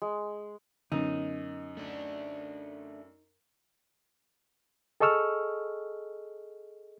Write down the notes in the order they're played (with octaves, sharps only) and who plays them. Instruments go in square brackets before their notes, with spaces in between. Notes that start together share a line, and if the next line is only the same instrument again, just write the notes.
[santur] G#3
[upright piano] F#2 [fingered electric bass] D3 F#3 B3 [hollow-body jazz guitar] D#4
[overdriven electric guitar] A3 D4
[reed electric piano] G#4 A4 D#5 C#6 E6 F6